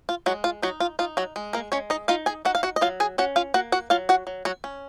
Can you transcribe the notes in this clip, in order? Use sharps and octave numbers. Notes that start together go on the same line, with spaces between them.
F4
F#3 G#3 F#4
F4
F#3 D#4 F#4
F4
D#4 F4
F#3 F#4
G#3
A#3 A#4
G#3 C#4 C#5
D#4 D#5
D#4 F4 F5
G#4 G#5
D#4 F#4 F#5
F5
F#4 F#5
D#5
F#3 F4 F5
G#4 G#5
C#4 F#4 F#5
F4 F5
A#3 F#4 F#5
F#4 F#5
F#3 F4 F5
F#4 F#5
F#3
F#3 F#4
C#4